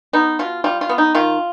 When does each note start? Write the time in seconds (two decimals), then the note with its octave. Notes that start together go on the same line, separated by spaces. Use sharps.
0.13 B3 D#4
0.39 B2 F4
0.64 G3 F4
0.81 F4
0.89 B3
0.98 D#4
1.15 D#3 F4